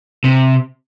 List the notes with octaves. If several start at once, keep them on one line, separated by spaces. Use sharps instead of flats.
C3